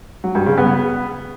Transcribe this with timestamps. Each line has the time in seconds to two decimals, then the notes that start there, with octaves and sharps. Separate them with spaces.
0.24 F#3
0.35 G2
0.46 C#3
0.58 B3